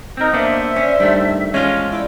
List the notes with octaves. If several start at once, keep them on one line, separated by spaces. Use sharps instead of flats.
C4 D#4 A#4
A#3 B3 D4 C5 E5
C#4 D4
G2 D#3 A3 G5
E3 F3 G#3 B3 C#4 F4
E4 D5 G5